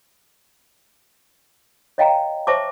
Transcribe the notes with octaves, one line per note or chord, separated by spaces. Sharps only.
C#5 D#5 F5 G5 G#5 A#5
C5 C#5 E5 A5 C#6 D6